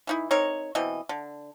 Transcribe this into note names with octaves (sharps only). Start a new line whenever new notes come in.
E3 D#4 E4
C4 D#4 A#4 C#5
B2 E3 C4 D#5
D3